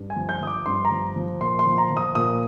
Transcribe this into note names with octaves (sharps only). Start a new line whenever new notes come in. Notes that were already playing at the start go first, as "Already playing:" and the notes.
Already playing: G2
G#5
F3
G6
F3 D#6
D6
G2 C6
A#5
F3
F3
A#2 C6
C6
F3
A#5
F3
D#6
A#2 D#6